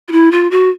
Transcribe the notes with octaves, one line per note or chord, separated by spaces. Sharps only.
F4
E4
F4
F#4